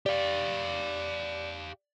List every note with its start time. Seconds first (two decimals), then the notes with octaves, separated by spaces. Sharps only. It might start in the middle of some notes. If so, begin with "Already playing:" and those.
0.06 G4 D5 F5